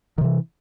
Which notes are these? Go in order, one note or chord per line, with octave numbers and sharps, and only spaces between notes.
C3 D#3 E3